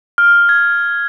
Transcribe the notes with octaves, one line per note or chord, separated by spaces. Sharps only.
F6
G#6